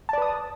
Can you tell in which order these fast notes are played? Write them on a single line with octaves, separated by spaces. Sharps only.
A5 D5 B4 D#6